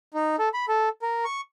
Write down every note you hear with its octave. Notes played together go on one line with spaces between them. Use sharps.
D#4
A4
B5
A4
A#4
C#6